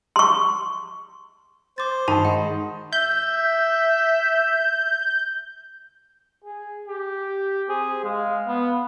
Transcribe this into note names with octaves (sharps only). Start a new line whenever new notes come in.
C6 C#6
C5 D6 A6
G2 D#3 A5 B5
G#3 G#4 D#5 F#5
E5 G6
G#4
G4
C4 G#4
G#3 F5
B3